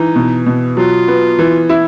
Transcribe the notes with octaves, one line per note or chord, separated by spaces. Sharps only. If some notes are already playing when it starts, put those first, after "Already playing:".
Already playing: E3 D#4
B2
B2
F#3 F4
B3
E3
E4